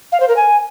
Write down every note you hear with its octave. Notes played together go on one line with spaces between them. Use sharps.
F5
C5
A#4
G#5